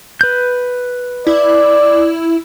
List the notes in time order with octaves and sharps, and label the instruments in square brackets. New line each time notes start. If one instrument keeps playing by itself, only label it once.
[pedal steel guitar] B4 G6
[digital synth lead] E4 [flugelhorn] D5